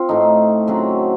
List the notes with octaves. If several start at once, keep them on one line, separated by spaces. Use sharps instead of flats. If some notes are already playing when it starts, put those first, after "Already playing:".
Already playing: C4 F4
A2 A3 D#4
C#3 F#3 C4 F#4